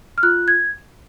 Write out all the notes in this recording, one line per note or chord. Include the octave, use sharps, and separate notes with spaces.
F6
F4 F#6
G#6